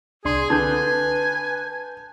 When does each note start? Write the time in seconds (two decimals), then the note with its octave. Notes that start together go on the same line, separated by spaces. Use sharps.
0.25 C2 D4 G#4 C6
0.50 D3 B4 G#5 A5 G6